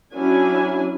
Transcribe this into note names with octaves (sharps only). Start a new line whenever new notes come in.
F#3 C#4 D4 E4 G#5